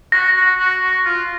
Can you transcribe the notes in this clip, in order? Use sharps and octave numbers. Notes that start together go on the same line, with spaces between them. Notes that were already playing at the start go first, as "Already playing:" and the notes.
F#4 A#6
F#4
F#4
F#4
F4